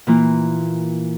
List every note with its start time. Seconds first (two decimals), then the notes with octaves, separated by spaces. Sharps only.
0.07 A#2 E3 A#3